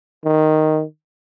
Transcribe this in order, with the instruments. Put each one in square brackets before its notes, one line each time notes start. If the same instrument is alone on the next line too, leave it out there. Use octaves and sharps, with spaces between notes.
[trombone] D#3